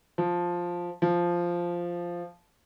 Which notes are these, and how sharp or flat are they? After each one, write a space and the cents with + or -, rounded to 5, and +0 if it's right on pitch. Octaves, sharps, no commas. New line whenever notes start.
F3 +5
F3 -5